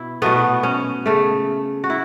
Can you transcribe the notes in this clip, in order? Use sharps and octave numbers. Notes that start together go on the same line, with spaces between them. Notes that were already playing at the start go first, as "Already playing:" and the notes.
Already playing: B2 E4
B2 F#3 A3 B3
C#4
C#3 A3
F#4
E4